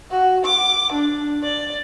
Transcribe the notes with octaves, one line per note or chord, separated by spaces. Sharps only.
F#4
D6
D4
D5